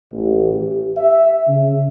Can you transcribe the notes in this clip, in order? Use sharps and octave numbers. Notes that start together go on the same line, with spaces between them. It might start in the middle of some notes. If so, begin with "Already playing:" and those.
A1
G4
E5
C#3